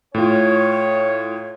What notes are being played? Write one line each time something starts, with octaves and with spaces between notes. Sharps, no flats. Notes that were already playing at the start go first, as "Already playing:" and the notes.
A2 F4 C#5